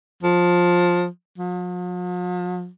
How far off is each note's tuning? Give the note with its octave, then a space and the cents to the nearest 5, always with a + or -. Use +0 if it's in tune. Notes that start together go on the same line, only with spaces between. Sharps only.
F3 +15
F3 +45